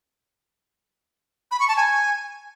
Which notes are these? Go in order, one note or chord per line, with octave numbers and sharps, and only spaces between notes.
B5
C#6
A5
G#5